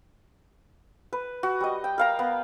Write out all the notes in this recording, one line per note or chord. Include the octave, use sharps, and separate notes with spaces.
B4
F#4
G3 D#5
G5
A#4 F5 A#5
B3